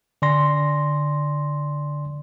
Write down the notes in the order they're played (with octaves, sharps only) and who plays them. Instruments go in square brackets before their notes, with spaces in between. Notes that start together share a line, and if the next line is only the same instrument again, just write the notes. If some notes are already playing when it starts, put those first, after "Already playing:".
[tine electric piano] D3 D5 G#5 C6 A#6